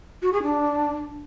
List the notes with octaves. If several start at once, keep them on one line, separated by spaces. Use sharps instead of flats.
F#4
G#4
D4